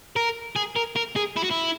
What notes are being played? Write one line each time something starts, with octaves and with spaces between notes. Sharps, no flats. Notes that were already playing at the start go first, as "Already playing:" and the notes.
A#4
G#4
A#4
A#4
G#4
E4
F#4
E4